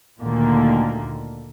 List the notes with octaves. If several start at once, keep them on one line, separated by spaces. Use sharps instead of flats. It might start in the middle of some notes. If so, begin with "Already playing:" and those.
D2 A#2 D3 D#3 A3 A#3